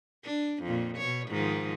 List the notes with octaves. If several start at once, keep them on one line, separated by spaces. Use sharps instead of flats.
D4
F2 A#2
B2 C#5
G#2 D#3 F3